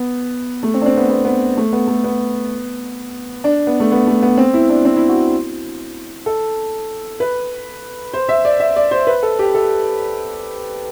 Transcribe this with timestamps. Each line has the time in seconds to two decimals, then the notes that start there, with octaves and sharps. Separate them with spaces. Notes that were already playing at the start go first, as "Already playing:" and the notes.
Already playing: B3
0.63 A3
0.74 C4
0.82 D4
0.86 C4
0.97 B3
1.09 B3
1.25 B3
1.57 A3
1.73 B3
1.87 A3
2.04 B3
3.44 D4
3.67 B3
3.80 A3
3.92 B3
4.07 A3
4.23 B3
4.38 C4
4.53 E4
4.70 D4
4.85 C4
4.96 E4
5.09 F#4
6.26 A4
7.20 B4
8.13 C5
8.29 E5
8.45 D5
8.60 E5
8.76 D5
8.91 C5
9.07 B4
9.23 A4
9.39 G4
9.54 A4